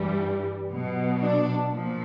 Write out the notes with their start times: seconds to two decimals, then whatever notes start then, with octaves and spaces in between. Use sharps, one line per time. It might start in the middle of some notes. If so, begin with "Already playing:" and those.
Already playing: G2 E3 G3
0.68 B2 F#3
1.20 D4
1.72 A#2 F3